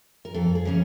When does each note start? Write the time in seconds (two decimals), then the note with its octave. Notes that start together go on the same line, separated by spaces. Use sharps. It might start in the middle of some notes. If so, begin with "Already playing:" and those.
0.25 A#4
0.34 F2 A4
0.55 G#4
0.65 C#3 F3 A#3 C#4